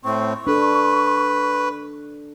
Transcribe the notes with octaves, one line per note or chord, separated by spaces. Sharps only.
A2 C4 C#6
D4 A4 B4